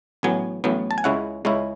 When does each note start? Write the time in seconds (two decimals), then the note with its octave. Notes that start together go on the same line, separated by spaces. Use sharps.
0.23 A1 A2 F#3 B3 G#5
0.64 A1 A2 F#3 B3
0.91 A5
0.98 G#5
1.04 C#2 C#3 G#3 C#4 E4 F#5
1.45 C#2 C#3 G#3 C#4 E4